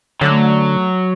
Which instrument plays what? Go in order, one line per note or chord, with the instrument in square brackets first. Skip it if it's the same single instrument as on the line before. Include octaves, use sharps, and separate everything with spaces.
[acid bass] D3 [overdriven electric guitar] F#3 [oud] A3 C#4 A4